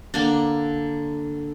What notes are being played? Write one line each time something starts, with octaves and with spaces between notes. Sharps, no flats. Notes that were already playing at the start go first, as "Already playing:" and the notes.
D3 A#3 D4